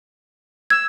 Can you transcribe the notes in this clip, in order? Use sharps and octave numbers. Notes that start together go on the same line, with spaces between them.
E6 G#6